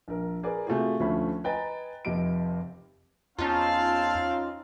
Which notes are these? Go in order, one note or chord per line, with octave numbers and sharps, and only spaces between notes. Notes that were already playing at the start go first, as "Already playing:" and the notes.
A#1 A#4
G#4 A#4 B4 D5
C3 A3 F4 F#4 G#4
D2 F3 A3 C#4 E5 B5
B4 D#5 G5 G#5 A#5 A6
F1 F2 G4 D#5 D7
E2 C4 C#4 D#4 F4 F5 A5